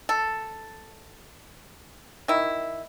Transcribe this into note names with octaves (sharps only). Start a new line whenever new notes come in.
A4
D#3 E4